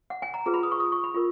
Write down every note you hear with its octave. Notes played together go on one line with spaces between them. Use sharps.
F#5
G#5
A#5
F4 G#4 B4 A#5
B5
D#6
C#6
D#6
C#6
B5
F4 A#4